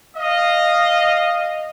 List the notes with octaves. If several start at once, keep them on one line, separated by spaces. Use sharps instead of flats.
D#5 F5